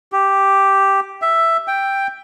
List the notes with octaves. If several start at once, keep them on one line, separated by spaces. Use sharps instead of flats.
G4
E5
G5